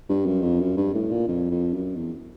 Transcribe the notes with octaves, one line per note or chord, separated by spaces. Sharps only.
G2
F#2
F2
F#2
G2
A2
A#2
F2
F2
F#2
E2